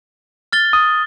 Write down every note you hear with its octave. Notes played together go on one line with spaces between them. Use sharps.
F6 A6 G7
D#6